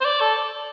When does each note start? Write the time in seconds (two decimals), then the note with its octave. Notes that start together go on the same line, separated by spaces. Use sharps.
0.01 C5
0.05 D5
0.20 A4